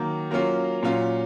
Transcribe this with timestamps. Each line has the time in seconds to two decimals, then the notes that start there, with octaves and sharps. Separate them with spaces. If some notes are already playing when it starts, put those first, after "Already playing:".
Already playing: D#3 F#3 A#3
0.31 F#3 A#3 C#4 F4
0.83 A#2 F#3 C#4 F4